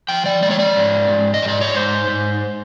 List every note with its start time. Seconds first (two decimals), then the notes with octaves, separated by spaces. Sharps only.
0.09 F3 G5
0.26 D5
0.42 G#3 D5
0.51 C#5
0.59 D5
0.76 G#2
1.09 G#2
1.34 D#5
1.42 G#2
1.48 D5
1.61 C#5
1.74 G#2 C5
2.08 G#2